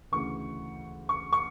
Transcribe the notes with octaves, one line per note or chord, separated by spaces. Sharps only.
D2 C#3 E3 C#6
C#6
C#6